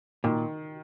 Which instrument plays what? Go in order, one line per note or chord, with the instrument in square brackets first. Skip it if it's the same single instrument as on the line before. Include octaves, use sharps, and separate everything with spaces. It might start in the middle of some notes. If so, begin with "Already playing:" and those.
[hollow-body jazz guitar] A#2 [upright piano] D#3